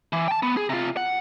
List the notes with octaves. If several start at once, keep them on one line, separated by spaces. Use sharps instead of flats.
E3
G5 A5
B3
G#4
C3 F4
F#5